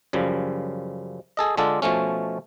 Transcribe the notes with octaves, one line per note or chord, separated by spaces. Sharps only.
F#2 C#3 F3 G3
G#4 A4 D#5
D3 G#3 D4 F4 A4
B2 F3 A3 C#4